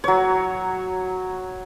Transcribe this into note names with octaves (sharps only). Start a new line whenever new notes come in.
F#3 C#5